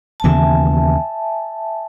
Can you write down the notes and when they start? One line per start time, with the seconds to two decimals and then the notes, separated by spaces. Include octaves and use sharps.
0.20 A5
0.24 D#2 C#3 E3 B3 E5 G#5